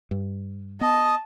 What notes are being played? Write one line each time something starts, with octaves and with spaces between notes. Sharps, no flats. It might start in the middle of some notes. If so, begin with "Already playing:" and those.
G2
B3 D#5 A5